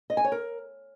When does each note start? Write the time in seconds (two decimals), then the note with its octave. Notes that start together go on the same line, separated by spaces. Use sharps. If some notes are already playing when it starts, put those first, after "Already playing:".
0.10 D#5
0.17 G#5
0.24 C#5
0.32 A#4